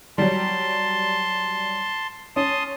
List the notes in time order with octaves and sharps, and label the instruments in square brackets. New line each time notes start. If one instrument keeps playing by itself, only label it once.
[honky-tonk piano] F#3 G3 [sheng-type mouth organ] A5 C6
[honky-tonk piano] C#4 [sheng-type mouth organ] A5 C6 D#6